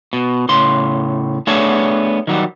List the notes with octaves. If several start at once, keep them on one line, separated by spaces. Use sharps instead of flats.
B2
A2 C#3 C6
A3 B3 D4 G#4 C#5 A5
D#3 F#3 G3